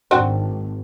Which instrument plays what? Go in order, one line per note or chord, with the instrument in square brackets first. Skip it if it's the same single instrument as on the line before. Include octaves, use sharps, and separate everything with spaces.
[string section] G#1 [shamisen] C4 D4 F#4